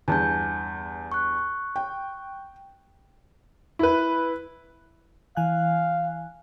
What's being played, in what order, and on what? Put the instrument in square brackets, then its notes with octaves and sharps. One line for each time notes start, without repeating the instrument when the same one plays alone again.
[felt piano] E2 G2 [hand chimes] G#5 A5 G6
[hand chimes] C#6 F#6
[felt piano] G5
[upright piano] E4 B4
[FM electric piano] E3 G#5 F#6 [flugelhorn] F5